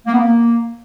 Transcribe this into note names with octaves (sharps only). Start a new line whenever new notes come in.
A#3
B3
A#3